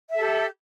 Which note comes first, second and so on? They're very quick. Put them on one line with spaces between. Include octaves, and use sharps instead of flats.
E5 A4 G4